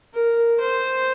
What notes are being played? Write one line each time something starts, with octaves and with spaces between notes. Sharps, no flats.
A#4
C5